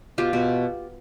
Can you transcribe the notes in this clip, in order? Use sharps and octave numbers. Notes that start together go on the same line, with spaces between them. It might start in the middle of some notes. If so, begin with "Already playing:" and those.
B2 F4 G4
B2